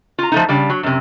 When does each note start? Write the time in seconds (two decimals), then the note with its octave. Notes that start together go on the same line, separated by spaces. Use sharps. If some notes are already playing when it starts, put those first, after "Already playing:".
0.19 F4 A#5
0.32 F3 A3 D#4
0.49 C#3 G3 D4
0.70 F#3
0.83 F#2 C3